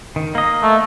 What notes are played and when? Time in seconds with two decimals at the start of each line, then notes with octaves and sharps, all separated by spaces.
0.16 D#3
0.35 A#3 D#5
0.63 A3